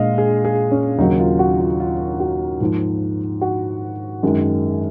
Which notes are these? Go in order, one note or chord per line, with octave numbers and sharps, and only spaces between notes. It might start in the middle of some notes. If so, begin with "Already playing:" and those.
Already playing: A#2 G#3 D#5 F5
G#4
G#4
C#4
D#2 C#3 F#3 A#3 D#4
F4
F#4
F4
F4
F#4
G#2 F3 A#3
F#4
F#2 D#3 G#3